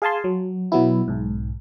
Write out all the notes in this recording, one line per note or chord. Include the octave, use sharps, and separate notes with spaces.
G#4 F5 G#5 A5 C6
F#3
B2 F#3 B3 E4
B1 G#2